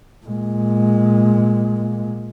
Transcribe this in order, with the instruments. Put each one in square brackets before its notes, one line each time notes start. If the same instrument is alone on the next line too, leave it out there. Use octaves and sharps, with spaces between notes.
[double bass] A#2 G#3